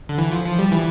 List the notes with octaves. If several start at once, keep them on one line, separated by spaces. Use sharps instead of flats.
D3
E3
F3
F3
G3
E3